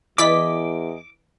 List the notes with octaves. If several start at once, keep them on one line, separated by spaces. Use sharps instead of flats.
E2 E3 D5 D#5 G#5 D6 B6